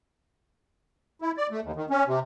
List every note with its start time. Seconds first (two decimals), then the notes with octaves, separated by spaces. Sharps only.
1.22 E4
1.37 D5
1.51 A3
1.63 D#2
1.76 D#3
1.90 C#4
2.07 C3